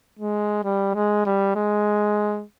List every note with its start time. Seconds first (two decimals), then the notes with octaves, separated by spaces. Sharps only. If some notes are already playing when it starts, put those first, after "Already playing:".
0.19 G#3
0.64 G3
0.95 G#3
1.26 G3
1.56 G#3